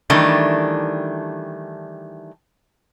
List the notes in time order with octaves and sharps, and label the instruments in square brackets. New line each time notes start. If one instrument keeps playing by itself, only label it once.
[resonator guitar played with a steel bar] D#3 E3 G3 A3 D4